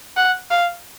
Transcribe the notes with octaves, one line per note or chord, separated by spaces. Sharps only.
F#5
F5